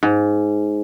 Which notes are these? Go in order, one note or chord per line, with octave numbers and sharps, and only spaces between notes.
G#2